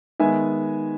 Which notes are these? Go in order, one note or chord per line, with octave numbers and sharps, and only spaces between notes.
D#3 G#3 B3 E5 G#5